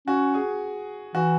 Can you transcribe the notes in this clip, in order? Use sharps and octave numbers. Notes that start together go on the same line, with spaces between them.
C#4 F#4
G#4
E3 F#4